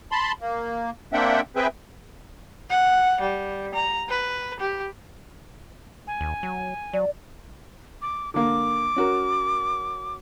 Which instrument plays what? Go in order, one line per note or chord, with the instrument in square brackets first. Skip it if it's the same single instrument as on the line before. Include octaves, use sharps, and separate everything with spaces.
[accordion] A5 B5 C6
A#3
A#3 C4 D4 E5 F#5 G5
C4 G#4 B4 E5 G5
[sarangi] F#5
G3
A#5
B4
G4
[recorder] G#5
[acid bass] D#2
F#3
[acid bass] F#3 [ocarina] D5
[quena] D6
[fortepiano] D3 A#3 [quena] D6
[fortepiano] C#4 F#4 A#4